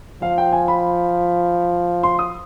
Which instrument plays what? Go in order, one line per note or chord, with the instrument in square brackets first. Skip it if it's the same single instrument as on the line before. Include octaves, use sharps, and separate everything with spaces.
[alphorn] F3 [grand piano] F5
[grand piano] G5
G#5
B5
C6
D#6